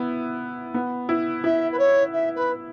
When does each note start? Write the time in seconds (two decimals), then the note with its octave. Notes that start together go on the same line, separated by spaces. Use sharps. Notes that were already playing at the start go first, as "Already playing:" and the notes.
Already playing: B3 E4
0.74 B3
1.09 E4
1.43 E4 E5
1.72 B4
1.79 C#5
2.13 E5
2.35 B4